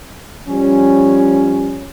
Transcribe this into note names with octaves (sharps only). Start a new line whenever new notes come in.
F3 G3 C#4